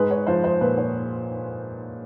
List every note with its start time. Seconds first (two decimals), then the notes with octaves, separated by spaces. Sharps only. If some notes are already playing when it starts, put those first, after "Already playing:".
Already playing: G#2 G#3 B4
0.11 C#5
0.27 F3 C5
0.44 C5
0.61 A#2 B4
0.78 C#5